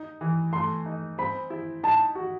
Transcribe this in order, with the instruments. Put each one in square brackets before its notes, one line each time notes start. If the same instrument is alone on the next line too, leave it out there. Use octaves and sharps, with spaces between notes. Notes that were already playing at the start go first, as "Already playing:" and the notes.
Already playing: [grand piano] D#4
E3
[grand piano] A3 [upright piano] C6
[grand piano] D#4
[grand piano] C4 [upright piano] B5
[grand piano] E4
[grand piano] D#4 [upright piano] A5
[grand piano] F#4